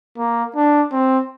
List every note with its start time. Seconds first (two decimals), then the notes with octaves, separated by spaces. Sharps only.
0.17 A#3
0.56 D4
0.92 C4